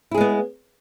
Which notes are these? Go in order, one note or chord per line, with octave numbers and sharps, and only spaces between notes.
G#3 B3 E4 G#4